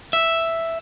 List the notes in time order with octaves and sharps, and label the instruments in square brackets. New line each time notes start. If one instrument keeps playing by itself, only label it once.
[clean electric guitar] E5